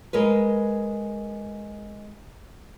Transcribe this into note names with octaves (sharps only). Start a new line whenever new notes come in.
G#3 A#4 B4